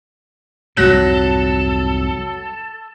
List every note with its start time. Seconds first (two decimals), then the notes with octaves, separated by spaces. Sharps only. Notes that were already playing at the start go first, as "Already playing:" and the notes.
0.77 C2 F2 G#2 F#3 A4 F#6 A#6